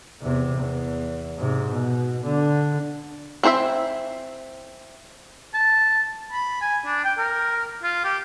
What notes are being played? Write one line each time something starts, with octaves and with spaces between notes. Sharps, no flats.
E2 C3
E2
G#2 C3
B2
D3
C4 E4 C5 C#5 E5
A5
B5
G#5
D4
G5
A#4
F4
G4